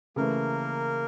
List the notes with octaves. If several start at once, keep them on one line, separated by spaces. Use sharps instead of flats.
C#3 E3 A3 A#3 A#4